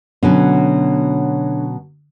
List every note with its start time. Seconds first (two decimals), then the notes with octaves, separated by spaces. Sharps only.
0.23 B2 D3 F#3 C#4